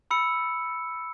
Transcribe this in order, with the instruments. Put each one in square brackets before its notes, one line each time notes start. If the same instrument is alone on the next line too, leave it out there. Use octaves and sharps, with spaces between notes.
[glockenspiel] B5 E6 C#7